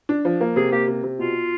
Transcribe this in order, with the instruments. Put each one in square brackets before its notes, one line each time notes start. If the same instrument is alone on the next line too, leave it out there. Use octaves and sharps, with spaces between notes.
[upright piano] D4
F3
A#3
[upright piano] C3 [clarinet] G#4
[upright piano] A#3 [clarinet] G4
[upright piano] C3
C3
[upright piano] B2 [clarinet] F4